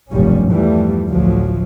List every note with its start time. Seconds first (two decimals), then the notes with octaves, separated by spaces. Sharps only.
0.10 F1 B1 G2 F3 G3 C#4
0.50 E2 G2 E3 F3 G3 A3
1.08 A1 D2 F3 F#3